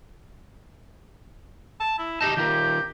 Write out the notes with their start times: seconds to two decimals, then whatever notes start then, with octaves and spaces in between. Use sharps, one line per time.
1.80 A5
1.98 E4
2.21 D#4 G4 D#5 A5
2.37 D#3 F4 G4 A#4